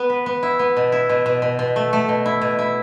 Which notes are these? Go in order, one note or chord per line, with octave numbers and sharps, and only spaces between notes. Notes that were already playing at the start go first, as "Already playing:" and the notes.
Already playing: B3
B4
B3
E4
B3
B2
E4
B2
B2
B2
B2
A3
A3
B2
E4
B2
E4